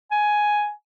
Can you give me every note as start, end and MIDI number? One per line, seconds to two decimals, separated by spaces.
0.11 0.71 80